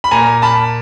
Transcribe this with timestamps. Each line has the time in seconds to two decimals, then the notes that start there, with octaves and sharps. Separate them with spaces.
0.04 B5
0.11 A#2 G#5 A#5
0.42 A5 B5